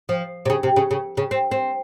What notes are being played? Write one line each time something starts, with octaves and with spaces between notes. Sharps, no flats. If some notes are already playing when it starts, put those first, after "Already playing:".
F3
C3
C#3
C3
C#3
C#3
C#3
C4
C4